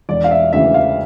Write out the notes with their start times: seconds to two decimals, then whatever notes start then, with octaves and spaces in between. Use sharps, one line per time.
0.09 E1 D5
0.24 F5
0.31 E5
0.53 D2 C#3 E3 E5
0.74 F5